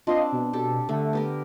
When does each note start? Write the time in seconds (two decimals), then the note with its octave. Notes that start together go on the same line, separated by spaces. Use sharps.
0.07 C4 D4 F4 D#5 C6
0.32 B2
0.53 G4 A4
0.89 D3 A3
1.13 B3 G4 A#4